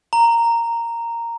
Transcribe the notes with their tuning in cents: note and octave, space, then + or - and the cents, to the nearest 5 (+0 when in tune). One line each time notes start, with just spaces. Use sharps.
A#5 -5